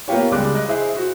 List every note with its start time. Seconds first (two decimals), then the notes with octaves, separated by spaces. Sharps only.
0.08 A#3 B3 F4 G4 C#5
0.31 C#2 G3 G#3 D6 F#6
0.55 D#5 F#6
0.68 E4 G#4 C5
0.96 F#4